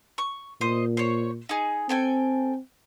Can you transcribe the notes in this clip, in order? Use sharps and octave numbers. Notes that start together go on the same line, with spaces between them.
C#6
A#2 C5 D#5
C5 C#5
D#4 G#4
C4 A4 G5 G#5